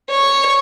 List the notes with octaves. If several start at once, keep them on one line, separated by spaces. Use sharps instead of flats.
C#5